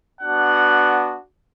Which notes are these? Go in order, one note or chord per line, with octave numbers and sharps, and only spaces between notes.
B3 D4 F#4 F#5